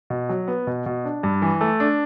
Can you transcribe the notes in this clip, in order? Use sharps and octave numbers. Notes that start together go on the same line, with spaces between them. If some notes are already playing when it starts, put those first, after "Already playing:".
B2
F#3
B3
B2
B2
D4
G2
E3
A3
D4